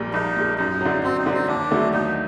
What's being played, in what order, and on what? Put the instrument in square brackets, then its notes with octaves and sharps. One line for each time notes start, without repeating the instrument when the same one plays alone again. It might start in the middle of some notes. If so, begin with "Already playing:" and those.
Already playing: [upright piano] A#1 A#2 G3
[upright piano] A#1 [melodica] D#4
[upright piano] A#2 G3
[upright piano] F#2 [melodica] D#4
[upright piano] D3 F#3
[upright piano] F#2 [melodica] C4
[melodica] D#4
[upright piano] D3 F#3
[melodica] C4
[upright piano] D#2 [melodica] D4
[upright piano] D3 F#3 A3
[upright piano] D#2 [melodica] D#4